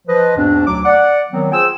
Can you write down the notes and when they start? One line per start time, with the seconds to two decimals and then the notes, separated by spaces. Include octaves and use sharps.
0.08 F3 B4 C5 D#5
0.37 E2 G#2 B2 C4 D4
0.67 D2 F#3 D6
0.85 D5 F#5
1.32 D#3 F#3 B3 C4
1.52 F4 G#4 C5 G5 G#5 E6